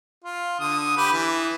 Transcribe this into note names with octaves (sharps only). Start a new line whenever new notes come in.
F4
D3 D#6
G4 B4
E3